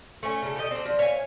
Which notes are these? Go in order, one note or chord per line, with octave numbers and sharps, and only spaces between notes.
A3 C#4
C#3 A4
G4 A4 A#4 D#5
C4 D4
F3
C#5 E5 F5 G#5